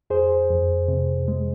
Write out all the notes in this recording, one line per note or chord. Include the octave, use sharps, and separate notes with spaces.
F2 G#4 C5
F2
C3
G#3